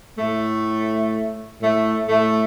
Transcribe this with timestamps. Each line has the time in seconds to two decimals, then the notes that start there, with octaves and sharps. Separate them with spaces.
0.17 A2 A3
1.60 A2 A3
2.08 A2 A3